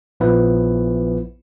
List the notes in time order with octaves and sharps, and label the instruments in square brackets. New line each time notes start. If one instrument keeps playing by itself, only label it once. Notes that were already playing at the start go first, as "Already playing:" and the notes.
[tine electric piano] A#1 F3 B3 E4 B4